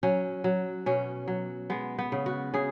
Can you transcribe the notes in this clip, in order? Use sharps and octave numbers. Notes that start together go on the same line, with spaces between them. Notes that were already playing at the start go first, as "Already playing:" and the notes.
F#3 C#4
F#3
B2 C#4
F#3
G#3 B3
B3
C#3
F#4
C#3 G#4